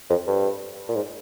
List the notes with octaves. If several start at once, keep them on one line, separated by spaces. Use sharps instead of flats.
F2
G2
A#2
G#2